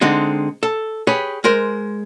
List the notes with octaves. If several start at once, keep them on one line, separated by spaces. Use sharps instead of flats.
D3 G#3 C4 D#4
A4
G4 G#4 B4 C#5
G#3 A#4 C5